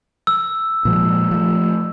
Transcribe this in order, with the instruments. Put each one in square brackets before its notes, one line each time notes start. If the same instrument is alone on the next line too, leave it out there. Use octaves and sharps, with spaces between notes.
[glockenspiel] E6
[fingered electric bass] A#2 F3 G#3
F3 A3